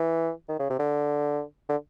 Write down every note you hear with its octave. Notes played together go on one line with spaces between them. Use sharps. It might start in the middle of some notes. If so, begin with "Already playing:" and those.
Already playing: E3
D#3
C#3
C3
D3
D3